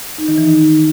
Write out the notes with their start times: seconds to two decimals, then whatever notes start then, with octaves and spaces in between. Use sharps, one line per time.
0.18 D#4
0.28 D#3
0.38 E3
0.47 D#4